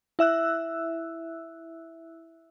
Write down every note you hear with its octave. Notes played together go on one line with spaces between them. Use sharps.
E4 E5 E6 F#6